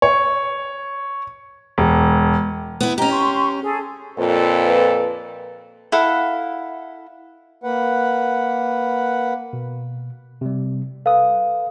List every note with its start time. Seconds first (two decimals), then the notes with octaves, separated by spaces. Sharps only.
0.02 C#5
1.78 E1
2.80 B3 E4
2.98 C#4 G4 D#5 A#5
3.11 C6 C#6
3.63 G#4 A4
4.18 F2 A#2 A4 B4
5.92 E4 A4 F5 F#5
7.64 A#3 B4 F#5
9.53 B2
10.41 C3 G3
11.06 A4 B4 F5 D#6